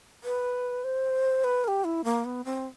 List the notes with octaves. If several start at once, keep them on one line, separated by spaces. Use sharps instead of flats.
B4
C5
B4
A#4
G4
E4
A#3
B3
C4